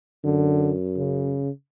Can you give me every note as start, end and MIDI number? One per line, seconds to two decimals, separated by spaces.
0.24 1.45 42
0.24 0.72 50
0.97 1.50 49